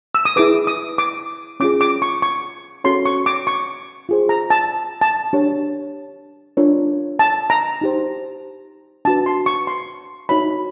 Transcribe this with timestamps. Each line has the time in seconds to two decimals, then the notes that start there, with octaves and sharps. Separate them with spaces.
0.15 E6
0.25 D#6
0.36 E4 G#4 B4 D6
0.67 D#6
0.98 D6
1.60 C#4 F4 G#4 D6
1.81 D6
2.02 C#6
2.22 C#6
2.84 C#4 F#4 A4 C#5 C6
3.06 C#6
3.26 D6
3.47 C#6
4.09 F4 G#4 C5
4.29 A#5
4.50 A5
5.01 A5
5.33 D4 G4 A#4 C#5
6.57 D4 F4 A#4 C#5
7.19 A5
7.50 A#5
7.81 D#4 G4 C5
9.05 D4 F#4 B4 A5
9.26 C6
9.46 C#6
9.67 C6
10.29 D#4 F#4 A#4 C#5 B5